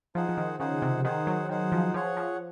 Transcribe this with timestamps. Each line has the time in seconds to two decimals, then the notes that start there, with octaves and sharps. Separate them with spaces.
0.15 F3 D#4 G#4 C5 F#5
0.29 F3
0.38 D#3
0.59 C#3 D#4 G#4 C5 F#5
0.82 C3
1.04 D#3 D#4 G#4 C5 F#5
1.27 F#3
1.49 D#3 D#4 G#4 C5 F#5
1.72 F3
1.94 F3 G#4 C#5 F#5
2.17 F3